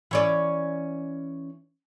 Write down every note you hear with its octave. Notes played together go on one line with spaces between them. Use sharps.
E3 C#4 D5